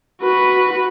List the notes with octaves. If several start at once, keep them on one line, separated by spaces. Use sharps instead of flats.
F#4 B4